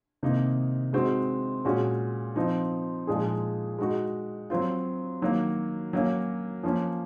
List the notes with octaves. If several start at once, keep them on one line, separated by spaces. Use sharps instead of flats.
C3 D#3 A#3 D#4
G#3 C4 D#4 F#4
A#2 G#3 C#4 F#4
F3 C4 D#4
A#2 F3 G#3 D#4 G#4
G#3 D#4 F#4
F#3 C4 F4
D#3 F#3 A#3
F#3 A#3 C#4
F3 A#3 C#4